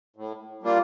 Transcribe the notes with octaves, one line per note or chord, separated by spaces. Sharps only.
A2
G3 A#3 D4 F4